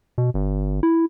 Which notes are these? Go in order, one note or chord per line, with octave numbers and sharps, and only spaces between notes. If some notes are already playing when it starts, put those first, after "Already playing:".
B2
G1
E4